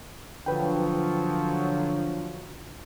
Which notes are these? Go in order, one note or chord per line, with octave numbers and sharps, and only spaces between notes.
D3 F3 F#3 B4 G5